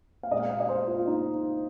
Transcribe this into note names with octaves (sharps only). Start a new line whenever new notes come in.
F5
A#2 G#3 D#5
F5
F5
D#5
C5
F4
F4
D#4